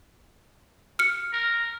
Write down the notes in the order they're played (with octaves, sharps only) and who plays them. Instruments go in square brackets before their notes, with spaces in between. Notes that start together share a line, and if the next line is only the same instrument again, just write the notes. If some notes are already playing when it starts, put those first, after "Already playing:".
[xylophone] F6 C#7
[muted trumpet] A#4